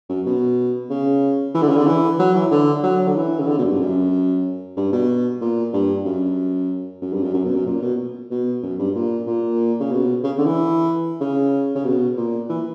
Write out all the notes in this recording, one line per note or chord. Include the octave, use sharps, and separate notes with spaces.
F#2
B2
C#3
E3
D3
C#3
D3
E3
F#3
E3
D3
F#3
D3
E3
C#3
D3
B2
F#2
G2
F#2
G2
B2
A#2
G2
F#2
F#2
G2
F#2
F#2
B2
F#2
A#2
B2
B2
F#2
G2
A#2
A#2
C#3
B2
C#3
D3
E3
C#3
C#3
B2
A#2
E3